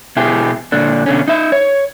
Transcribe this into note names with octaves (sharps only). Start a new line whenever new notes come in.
B2 E4 G4 G#4
A#2 D3 D4
B2 D3 C#4
D#4 E5
C#5